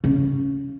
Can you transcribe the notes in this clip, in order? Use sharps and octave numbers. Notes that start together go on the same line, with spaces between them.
C#3